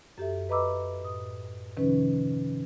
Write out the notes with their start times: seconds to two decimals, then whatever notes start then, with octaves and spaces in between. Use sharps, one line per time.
0.18 F#2 G4 A4 E5
0.49 B4 D#5 A#5 B5 D6 E6
1.01 A2 D#6
1.77 C3 D#3 F3 C#4 D#4 B4